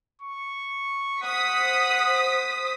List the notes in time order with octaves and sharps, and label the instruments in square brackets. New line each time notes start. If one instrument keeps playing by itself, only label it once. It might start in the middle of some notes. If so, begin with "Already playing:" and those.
[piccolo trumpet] C#6
[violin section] C5 D#6 B6 [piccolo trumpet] F#5